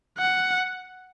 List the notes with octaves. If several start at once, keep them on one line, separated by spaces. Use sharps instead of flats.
F#5